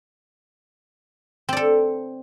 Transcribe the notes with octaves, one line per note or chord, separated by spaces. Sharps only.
C4 A4 D5